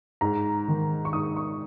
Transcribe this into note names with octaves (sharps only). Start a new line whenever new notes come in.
G#2 A#5
D#3
C#6
G#2 D#6
C#6